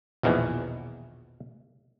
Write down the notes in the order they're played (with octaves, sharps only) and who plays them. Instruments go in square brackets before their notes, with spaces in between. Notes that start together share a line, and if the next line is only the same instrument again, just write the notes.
[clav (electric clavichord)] A#1 E2 B2 D#3 E3